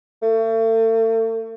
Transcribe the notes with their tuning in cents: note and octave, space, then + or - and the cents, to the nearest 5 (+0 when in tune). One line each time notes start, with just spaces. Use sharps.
A3 +40